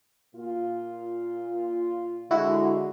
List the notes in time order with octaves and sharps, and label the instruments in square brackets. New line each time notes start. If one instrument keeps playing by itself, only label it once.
[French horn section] A#2 F4
[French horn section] D3 G#3 [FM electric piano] E4 F#4